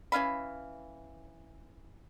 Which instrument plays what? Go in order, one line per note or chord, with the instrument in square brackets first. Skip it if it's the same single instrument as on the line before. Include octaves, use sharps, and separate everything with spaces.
[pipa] E3 C#4 F5 B5